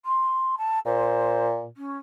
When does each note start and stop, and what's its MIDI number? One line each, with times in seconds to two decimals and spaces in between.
0.05 0.55 84
0.58 0.79 81
0.86 1.67 46
0.86 1.46 72
1.77 1.97 61